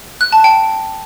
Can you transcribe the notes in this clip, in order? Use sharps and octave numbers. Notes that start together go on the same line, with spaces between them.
F#6
A5
G5